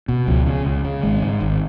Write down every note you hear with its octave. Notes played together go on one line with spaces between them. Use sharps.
B2
C#2 F3
C#3
C#2
C#3
G#1 G#3
G#2
G#1